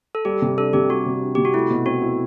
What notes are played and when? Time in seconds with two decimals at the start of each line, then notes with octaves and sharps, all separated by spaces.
0.15 A4
0.25 G3 G4
0.42 C3
0.57 D4 A4
0.73 C3 G4
0.90 G3 F#4
1.06 C3
1.22 D4
1.35 C3 G4
1.45 F#4
1.54 A3 E4
1.70 B2
1.86 C4 F#4
2.02 E4